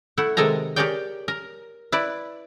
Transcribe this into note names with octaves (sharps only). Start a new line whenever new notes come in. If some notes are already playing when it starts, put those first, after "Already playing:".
A3 E4 F#5
C3 D#3 G#3 A4 G#5 A#5
G4 G#4 A#4 C#5 D5 G5
A#4
E4 B4 D5